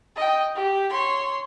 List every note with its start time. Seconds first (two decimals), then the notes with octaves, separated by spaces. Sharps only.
0.16 D#5 G5
0.56 G4
0.90 C#5 C6